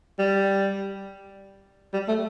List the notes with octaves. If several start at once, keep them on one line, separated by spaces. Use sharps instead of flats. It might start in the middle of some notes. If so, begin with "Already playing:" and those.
G3
G3
A3